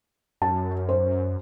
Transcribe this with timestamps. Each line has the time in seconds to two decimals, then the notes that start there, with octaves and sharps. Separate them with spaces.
0.42 F#2 A5
0.89 C5